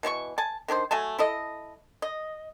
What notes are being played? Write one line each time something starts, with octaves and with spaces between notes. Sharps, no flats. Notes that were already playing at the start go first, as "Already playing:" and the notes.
B2 E3 C#4 C#6
G#5 A5
D#3 D4 G#4 C5
F#3 A3 G#5 A5
E4 A4 D#5
D#5